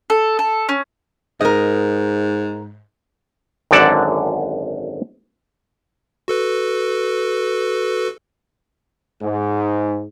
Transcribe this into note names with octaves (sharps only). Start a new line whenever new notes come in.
A4
A4
C#4
G#2 A#4 D#5
G#1 F#2 D3 D5 F#5 A5
F#4 A4 B4
G#2